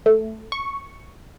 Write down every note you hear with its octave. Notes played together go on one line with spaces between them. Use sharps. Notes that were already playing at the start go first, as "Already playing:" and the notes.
A3
C#6